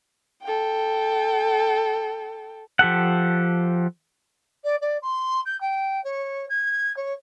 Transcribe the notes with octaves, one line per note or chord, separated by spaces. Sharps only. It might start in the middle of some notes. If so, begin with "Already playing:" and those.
A4 G5
F3 G4 A4 F#5
D5
D5
C6
G6
G5
C#5
G#6
C#5